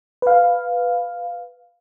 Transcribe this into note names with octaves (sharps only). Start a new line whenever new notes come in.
B4 F5